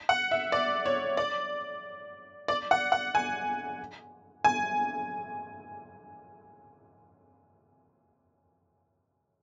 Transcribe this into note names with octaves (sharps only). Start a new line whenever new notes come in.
F#5
E5
D5
C#5
D5
D5
F#5
F#5
G#5
G#5